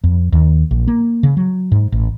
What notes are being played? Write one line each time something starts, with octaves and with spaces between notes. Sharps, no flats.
F2
D#2
A#1
A#3
C#3
F#3
G#2
A1